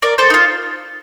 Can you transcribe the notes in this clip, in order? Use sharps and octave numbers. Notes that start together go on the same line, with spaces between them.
A#4 D5
A4 C5
D#4
F4